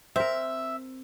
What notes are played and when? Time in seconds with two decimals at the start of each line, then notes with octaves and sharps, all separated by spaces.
0.16 C4 A#4 E5